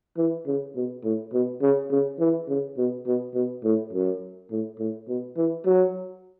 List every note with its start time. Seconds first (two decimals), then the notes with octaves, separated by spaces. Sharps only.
0.17 E3
0.46 C#3
0.75 B2
1.04 A2
1.33 B2
1.62 C#3
1.91 C#3
2.20 E3
2.48 C#3
2.78 B2
3.06 B2
3.34 B2
3.64 A2
3.93 F#2
4.51 A2
4.79 A2
5.08 B2
5.37 E3
5.66 F#3